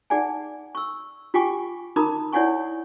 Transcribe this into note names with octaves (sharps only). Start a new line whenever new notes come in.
D#4 G#4 D5 F#5 G#5
C#6 E6
F4 G4 G5 G#5 C#6 D6
D#4 A#4 A#5 B5 D6 D#6
E4 C#5 D5 F#5 G#5 C#6